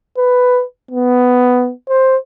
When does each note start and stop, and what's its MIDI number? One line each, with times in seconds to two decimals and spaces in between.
0.17 0.63 71
0.91 1.72 59
1.89 2.16 72